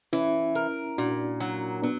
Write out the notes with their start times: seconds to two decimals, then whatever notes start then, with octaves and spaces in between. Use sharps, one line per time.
0.13 E3 C#4 E4
0.55 A#4
0.98 A#2 D4 F#4
1.40 F#3
1.82 F#3 B3 D4